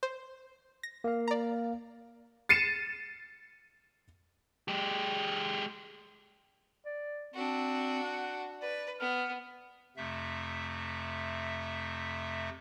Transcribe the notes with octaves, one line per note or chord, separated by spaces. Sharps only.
C5
A#6
A#3 F5
D5 A#5
A6 C7 C#7 D#7 E7
G#3 G4
D5
C4 D4 F#4
F#5
B4 D5
B3 F6
F2 C3 A3 E5